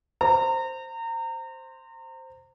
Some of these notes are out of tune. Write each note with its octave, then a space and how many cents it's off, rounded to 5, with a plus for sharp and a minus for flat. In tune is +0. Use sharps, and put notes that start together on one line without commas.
C5 +0 A#5 -30